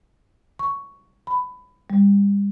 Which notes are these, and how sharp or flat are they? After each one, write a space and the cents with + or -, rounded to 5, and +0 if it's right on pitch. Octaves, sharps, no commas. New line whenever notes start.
C#6 +5
B5 +15
G3 +40